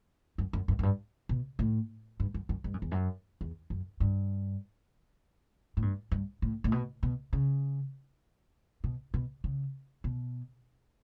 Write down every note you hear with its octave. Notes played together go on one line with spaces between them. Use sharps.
F#2
F#2
F#2
F#2
G2
B2
A2
G2
F#2
F#2
G2
F#2
E2
F#2
E2
F#2
G2
A2
G2
G2
A2
A2
B2
B2
C#3
B2
B2
C#3
B2